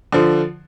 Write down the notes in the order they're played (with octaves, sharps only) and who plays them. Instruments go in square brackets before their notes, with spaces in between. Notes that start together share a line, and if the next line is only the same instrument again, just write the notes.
[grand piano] D3 F3